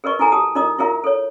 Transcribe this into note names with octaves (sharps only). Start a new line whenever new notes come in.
G#4 A#4 B4 D#5 C#6
E4 A4 G#5 A#5
G4 A5 D#6
D#4 F4 A#4 D#5 D6 D#6
E4 F4 G#4 A#4 E5
A4 C#5